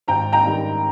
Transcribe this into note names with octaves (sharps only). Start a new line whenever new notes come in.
G#1 G5 A#5
G5 A#5
G2 D#3